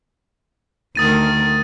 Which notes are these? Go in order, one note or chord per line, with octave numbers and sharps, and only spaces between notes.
D2 D#3 A#4 D#6 A6 D#7